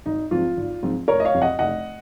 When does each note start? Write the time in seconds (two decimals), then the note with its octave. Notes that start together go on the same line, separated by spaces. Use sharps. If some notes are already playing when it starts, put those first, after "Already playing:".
0.06 G#1 D#4
0.31 G#2 F3 C4 F4
0.57 G#1
0.83 G#2 F3 C4
1.08 F1 A#4 C#5
1.20 D#5
1.25 C#5 F5
1.34 F2 C3
1.42 D#5 F#5
1.59 F1 D#5 F#5